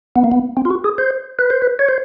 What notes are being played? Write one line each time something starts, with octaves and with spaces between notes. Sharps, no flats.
B3
A#3
B3
C4
F4
F#4
G#4
C5
B4
C5
B4
C#5
C5